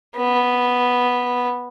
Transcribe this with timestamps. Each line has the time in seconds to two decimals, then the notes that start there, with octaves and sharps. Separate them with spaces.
0.17 B3